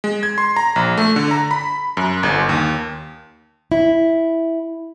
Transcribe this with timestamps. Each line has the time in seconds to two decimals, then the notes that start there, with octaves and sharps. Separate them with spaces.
0.04 G#3
0.23 G#6
0.38 C6
0.56 A#5
0.76 A#1
0.97 A3
1.16 D3
1.31 A#5
1.51 B5
1.97 F#2
2.23 G1
2.49 D#2
3.72 E4